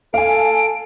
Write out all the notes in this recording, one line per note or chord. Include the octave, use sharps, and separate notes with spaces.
A4 F5 G#5 D7